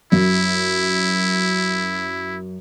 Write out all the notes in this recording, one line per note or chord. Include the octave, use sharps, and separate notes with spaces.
F#2 E4